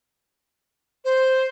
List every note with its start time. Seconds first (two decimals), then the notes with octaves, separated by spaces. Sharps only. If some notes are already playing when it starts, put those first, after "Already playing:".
1.05 C5